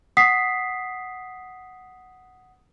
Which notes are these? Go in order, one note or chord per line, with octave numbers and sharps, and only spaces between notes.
F#5 D#6 B6 C7